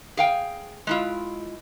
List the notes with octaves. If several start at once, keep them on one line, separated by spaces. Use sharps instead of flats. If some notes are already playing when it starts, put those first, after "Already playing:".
G#4 F5 G5
G#3 E4 F4